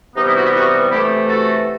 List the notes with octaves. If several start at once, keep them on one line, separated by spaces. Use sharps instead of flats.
C3 E3 G3 B3 D#4
E4
D#4 F#4
E4 G4
D#4 F#4
C3 E3 A3 E4 G4
F#4 A4